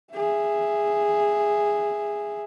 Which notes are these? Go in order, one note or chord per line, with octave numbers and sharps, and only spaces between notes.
G#4 E5